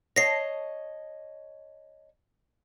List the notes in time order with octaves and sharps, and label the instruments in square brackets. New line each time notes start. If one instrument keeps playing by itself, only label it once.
[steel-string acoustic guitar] C#5 D#5 A5 [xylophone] A#6 C7